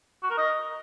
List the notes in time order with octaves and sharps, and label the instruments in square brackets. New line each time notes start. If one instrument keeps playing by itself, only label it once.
[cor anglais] F#4
A#4
D#5